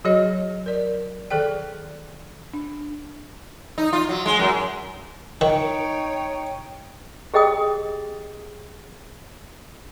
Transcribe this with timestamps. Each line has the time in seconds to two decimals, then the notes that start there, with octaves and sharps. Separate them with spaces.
0.05 F#3 F#4 G#4 C#5 D#5
0.66 A#4 D5
1.31 D#3 G#4 A4 D5 G5
2.54 D4
3.78 D#4
3.93 F4
4.09 F#3
4.26 G#3
4.39 F#2
5.41 D#3 D#4 C#5 G5
7.34 G4 G#4 D#5 G5 D#6